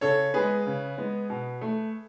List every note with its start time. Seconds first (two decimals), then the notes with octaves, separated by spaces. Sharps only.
0.01 C#3 A4 C#5
0.34 G#3 B3 G#4 B4
0.66 C#3
0.98 G#3 B3
1.30 B2
1.61 A3